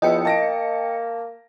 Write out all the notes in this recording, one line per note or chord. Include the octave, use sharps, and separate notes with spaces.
E2 F3 B3 E4 D#5 G5 C#7
A#3 A5 A#6 D7